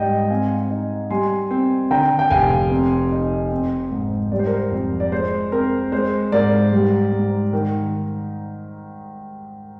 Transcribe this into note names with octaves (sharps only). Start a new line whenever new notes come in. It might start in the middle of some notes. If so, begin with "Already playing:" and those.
Already playing: G#2 G3 D5 D#5 G5
C4 F5 G#5
D#4
G3 G#5 C6
C4
D3 G5 A#5
G5
F1 F5 G#5
C4
D#4
C4
G#2
G3 D5
C5
A#4
C5
F2
D5
G#3 C5
C4 A#4
G#3 C5
G#2 A#4 D5
G3
G#2
D#3